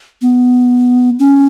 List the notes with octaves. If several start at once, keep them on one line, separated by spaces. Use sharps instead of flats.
B3
C#4